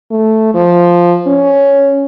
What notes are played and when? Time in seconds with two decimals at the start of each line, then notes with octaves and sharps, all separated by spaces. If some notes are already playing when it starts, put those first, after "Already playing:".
0.11 A3
0.54 F3
1.27 C#4